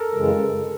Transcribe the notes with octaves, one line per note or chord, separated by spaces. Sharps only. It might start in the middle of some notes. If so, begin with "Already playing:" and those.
Already playing: A4 A#4
F#2 C#3 E3 G#3